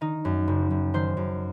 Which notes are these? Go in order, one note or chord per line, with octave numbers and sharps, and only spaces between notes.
D#3 D#4
F#2
F#1
F#1
D#3 C5
F#2